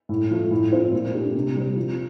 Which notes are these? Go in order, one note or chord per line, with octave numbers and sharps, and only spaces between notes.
A2
F3 A3
A2
F3 C4 F4 C5
A#2
A3 D4 G4
C3
G3 C4
F3